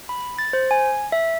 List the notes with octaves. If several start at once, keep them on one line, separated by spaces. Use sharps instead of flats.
B5
A6
C5
G#5
E5